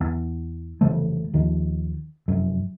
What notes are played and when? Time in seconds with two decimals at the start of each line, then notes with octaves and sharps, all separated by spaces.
0.01 E2
0.81 F1 C#3 E3 A3
1.33 D#2 D#3 F3
2.28 F1 F#2